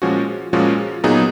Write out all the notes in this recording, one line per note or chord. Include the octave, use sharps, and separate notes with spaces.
A#2 F3 G#3 C#4 F#4
A#2 F3 G#3 C#4 F#4
A#2 F#3 B3 D#4 G#4